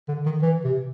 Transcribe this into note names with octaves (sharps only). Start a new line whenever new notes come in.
D3
D#3
E3
C3